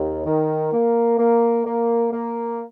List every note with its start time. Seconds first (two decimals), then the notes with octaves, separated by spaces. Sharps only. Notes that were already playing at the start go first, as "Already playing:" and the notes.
Already playing: D#2
0.26 D#3
0.73 A#3
1.19 A#3
1.66 A#3
2.13 A#3